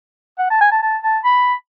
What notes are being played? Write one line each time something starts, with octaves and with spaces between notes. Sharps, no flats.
F#5
A5
G#5
A5
A5
A5
B5